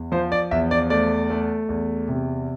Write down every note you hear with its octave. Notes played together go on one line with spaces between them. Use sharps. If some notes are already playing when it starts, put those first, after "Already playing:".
Already playing: E2
F3 C5
D5
E2 E5
D5
A3 D5
A3
E2
C3